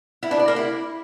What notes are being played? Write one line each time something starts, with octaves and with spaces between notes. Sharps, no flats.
E4
D4
D5
A#3
E4